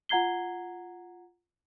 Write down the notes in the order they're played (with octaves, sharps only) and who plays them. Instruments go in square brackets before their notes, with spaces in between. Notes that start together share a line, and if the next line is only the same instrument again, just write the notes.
[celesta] F4 F#5 A#5 G#6 C7 G7